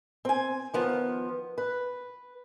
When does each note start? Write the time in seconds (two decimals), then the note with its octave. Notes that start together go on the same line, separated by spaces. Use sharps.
0.25 C4 G#5
0.74 D#3 F3 B3
1.58 B4